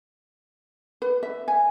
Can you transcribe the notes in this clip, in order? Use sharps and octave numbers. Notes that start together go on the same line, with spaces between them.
B4
E5
G#5